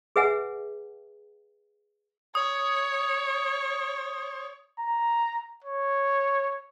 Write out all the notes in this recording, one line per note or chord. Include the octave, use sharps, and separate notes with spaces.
G#4 B4 E5 F#5 G#5
C#5 D#6
A#5
C#5